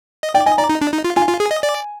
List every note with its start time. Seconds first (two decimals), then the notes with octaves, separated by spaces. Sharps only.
0.23 D#5
0.34 D5 G5
0.46 D#5 G#5
0.58 D5 A#5
0.69 D#4
0.81 D4
0.93 D#4
1.04 F4
1.16 F4 G#5
1.28 F4
1.40 G#4
1.51 D#5
1.63 D5